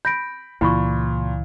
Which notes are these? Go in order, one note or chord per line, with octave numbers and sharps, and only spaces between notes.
B5 G6 A#6 D7
C#2 A#2 E3 E4 B5 C#6